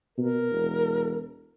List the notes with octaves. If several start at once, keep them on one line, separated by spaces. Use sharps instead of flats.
B2 A#4
E1